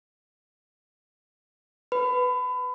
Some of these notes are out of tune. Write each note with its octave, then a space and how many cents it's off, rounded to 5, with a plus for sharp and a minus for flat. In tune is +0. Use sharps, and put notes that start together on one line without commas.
B4 +0 B5 +30